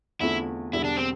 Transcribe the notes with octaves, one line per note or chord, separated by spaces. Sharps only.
E2 D3 A3 C4 E4 F4
E1 E2 D3 G3 E4
D4
C4